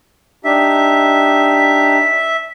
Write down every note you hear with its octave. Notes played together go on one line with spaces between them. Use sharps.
D4 D#4 G4 E5